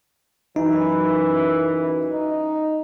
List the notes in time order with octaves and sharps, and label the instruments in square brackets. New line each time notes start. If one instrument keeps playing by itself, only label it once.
[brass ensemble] F#2 E3 [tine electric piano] D#4
[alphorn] D#4